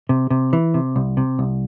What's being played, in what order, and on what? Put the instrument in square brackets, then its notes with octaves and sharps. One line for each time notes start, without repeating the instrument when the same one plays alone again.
[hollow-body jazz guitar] C3
C3
E3
C3
C2
C3
C2